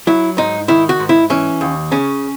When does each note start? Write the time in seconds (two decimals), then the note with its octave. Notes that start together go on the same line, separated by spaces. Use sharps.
0.07 F#3 E4
0.38 G#2 D#4
0.68 D#3 E4
0.89 F#4
1.00 G#2
1.09 E4
1.30 E3 C#4
1.61 D#2
1.91 C#3 C#4